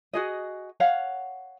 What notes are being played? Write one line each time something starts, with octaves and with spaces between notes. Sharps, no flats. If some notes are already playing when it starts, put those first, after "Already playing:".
F#4 G#4 D#5
C#5 F5 F#5